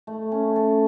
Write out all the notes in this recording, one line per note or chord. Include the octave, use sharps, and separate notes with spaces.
A3
C#4
A4